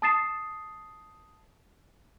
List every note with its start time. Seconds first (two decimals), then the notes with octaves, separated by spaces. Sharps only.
0.02 A5 D#6 A6 C7 E7